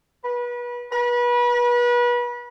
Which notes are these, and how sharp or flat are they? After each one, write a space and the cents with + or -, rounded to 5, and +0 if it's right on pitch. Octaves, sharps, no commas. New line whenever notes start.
B4 -30
B4 -30